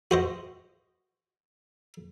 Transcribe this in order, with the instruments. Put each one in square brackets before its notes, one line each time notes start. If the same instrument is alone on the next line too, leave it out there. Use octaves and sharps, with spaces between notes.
[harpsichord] F#4 C5 D#5